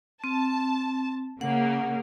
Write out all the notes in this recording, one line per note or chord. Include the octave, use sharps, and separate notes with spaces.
C4 A5
C#3 A#3 F#5